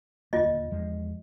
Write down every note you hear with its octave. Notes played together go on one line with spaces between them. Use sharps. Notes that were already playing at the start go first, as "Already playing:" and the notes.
D#1 D2 A#3 F4 D#5
E2 F3 G#3